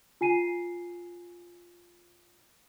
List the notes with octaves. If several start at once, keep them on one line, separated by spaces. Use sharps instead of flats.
F4 G#5 C7 D#7